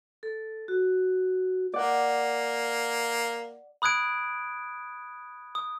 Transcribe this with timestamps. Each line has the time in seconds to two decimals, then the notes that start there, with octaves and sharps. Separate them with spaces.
0.23 A4
0.68 F#4
1.74 A#3 D5 F#5
3.82 B5 D#6 F#6 G#6 D7
5.55 D#6